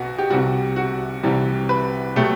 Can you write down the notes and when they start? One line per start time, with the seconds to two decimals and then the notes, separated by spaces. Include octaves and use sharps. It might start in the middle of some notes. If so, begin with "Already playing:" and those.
Already playing: B1 B2 F#4
0.18 G4
0.30 C2 C3 G3 F#4
0.76 F#4
1.23 C2 C3 E3 G3
1.69 B4
2.16 B2 F#3 A3 G4